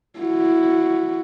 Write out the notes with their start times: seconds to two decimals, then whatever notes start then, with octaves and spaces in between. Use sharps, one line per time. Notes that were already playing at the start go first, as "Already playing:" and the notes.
0.19 E4 F#4